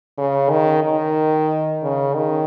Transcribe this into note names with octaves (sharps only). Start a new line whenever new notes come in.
C#3
D#3
D#3
C#3
D#3